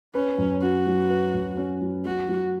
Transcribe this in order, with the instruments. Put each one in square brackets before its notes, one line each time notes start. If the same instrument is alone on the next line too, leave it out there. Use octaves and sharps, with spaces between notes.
[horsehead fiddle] C#4 [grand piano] B4
[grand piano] F#2
[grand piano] C#4 [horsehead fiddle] F#4
[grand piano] F#3
B4
F#2
C#4
F#3
[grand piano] F#3 [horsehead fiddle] F#4
[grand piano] F#3